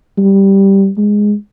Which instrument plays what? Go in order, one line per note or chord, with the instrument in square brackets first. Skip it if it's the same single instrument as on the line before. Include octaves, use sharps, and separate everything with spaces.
[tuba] G3
G#3